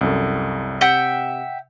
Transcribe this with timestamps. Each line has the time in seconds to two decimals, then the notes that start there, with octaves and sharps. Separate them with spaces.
0.01 C2 F#2 A4
0.81 C3 E5 F#5 G5